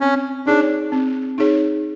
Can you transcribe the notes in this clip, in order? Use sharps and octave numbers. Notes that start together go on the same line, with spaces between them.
C4 C#4
D4 D#4 G#4 C#5
C4
D#4 G#4 C#5